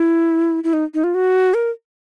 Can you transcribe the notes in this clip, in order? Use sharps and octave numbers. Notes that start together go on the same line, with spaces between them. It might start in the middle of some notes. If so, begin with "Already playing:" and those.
Already playing: E4
E4
D#4
D#4
F4
F#4
A#4